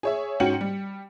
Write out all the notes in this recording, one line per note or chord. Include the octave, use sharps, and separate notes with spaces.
G#4 C#5 E5
G#2 C#4 F#4 G5 C#7 F#7
G3